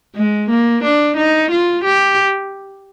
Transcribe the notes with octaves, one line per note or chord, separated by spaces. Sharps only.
G#3
A#3
D4
D#4
F4
G4